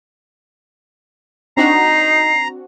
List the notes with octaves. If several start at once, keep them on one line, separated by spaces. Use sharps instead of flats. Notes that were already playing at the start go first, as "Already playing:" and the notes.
C4 D4 D#4 F#4 A#5 C7